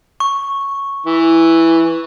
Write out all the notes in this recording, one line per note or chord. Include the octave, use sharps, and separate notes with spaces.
C#6
E3